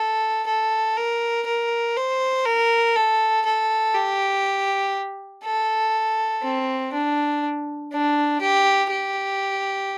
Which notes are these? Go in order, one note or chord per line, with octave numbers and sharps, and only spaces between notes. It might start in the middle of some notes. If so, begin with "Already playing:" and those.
Already playing: A4
A4
A#4
A#4
C5
A#4
A4
A4
G4
A4
C4
D4
D4
G4
G4